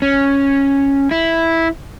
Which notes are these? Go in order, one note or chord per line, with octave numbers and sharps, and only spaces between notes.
C#4
E4